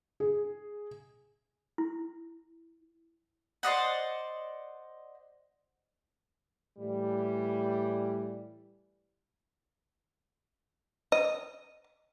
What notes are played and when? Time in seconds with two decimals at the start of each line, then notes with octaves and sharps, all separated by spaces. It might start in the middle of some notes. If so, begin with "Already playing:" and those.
0.20 G#4
1.78 E4
3.63 C5 D5 D#5 F#5
6.78 A2 E3 G3
11.12 D#5